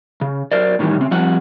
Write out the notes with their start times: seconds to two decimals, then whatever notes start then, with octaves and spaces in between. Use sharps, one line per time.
0.21 C#3
0.52 F#3 A#4 C5 D5
0.79 A2 D#3 E3 G3
0.98 C#3 C4
1.11 F3 G3 C4 F#5